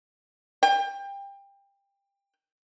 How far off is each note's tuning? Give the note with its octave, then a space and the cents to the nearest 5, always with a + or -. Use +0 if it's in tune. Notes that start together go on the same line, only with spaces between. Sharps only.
G5 +25